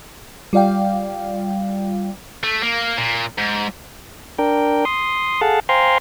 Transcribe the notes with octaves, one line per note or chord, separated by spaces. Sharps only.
G3 F4 D5 F5 G5
A3
A#3
A#2
G#2
D4 A#4 G5
C6 D#6
G#4 A4 F5 F#5 A5
C5 F5 G5 G#5 A#5 C6